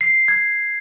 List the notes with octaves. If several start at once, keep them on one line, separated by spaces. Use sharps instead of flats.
C7
G#6